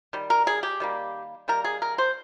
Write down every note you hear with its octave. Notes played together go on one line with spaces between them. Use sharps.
D#3 G3
A#4
G#4
G4
D#3 G3 A#3
D#3 G3 A#3 A#4
G#4
A#4
C5